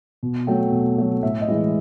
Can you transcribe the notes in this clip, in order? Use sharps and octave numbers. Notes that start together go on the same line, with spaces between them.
B2
F#3 A3 G5
B2
F#3 A3
A2 E5
D#5
E3 G#3 E5